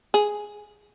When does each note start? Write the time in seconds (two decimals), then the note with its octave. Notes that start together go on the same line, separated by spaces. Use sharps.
0.14 G#4